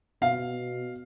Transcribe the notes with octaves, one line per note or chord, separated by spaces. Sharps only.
B2 F5